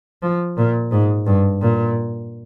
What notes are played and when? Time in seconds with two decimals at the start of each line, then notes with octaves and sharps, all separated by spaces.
0.22 F3
0.57 A#2
0.91 G#2
1.26 G2
1.61 A#2